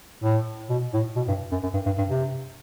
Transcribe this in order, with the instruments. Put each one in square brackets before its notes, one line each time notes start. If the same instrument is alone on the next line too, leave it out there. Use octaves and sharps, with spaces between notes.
[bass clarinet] A2
B2
A2
B2
G2
F#2
F#2
G2
G2
G2
C3